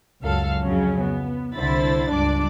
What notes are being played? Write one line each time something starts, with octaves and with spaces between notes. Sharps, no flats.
C#2 F#2 F#3 A4 F5
F2 C#3 F#3 C#4
B3
C2 D3 E4 C5 B5 A6
C#2 G2 D4 D5 D6